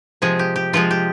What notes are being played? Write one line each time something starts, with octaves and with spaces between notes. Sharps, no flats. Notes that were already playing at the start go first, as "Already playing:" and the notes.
C3 F3 G#3 G#4
G4
G4
C3 F3 G#3 F4
G4